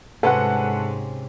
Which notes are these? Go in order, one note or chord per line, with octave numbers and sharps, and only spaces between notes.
G#2 C3 G#3 C#4 A4 B4 F#5